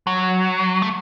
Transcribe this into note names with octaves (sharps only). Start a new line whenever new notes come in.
F#3
A3